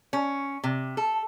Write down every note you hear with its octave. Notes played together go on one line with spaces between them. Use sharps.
C#4
C3
A4